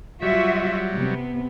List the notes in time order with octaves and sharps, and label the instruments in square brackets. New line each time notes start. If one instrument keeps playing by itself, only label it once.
[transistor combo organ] F#3 G3 [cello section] F4 F#4 E5
[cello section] C3 B3